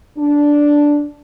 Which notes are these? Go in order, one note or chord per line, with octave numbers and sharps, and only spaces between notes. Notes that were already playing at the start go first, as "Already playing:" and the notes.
D4